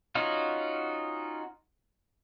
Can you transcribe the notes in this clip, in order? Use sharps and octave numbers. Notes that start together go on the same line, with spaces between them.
C#4 D#4 F4 F#4